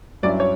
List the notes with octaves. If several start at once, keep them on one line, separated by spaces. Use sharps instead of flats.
G2 F#3 C#4 E4 D5
C#5